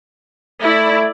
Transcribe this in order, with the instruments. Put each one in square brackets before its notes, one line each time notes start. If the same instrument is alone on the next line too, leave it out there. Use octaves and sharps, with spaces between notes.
[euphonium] A3 [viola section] E4 D5